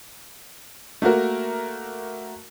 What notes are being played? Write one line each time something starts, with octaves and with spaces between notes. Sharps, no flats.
A3 A#3 F#4 A#4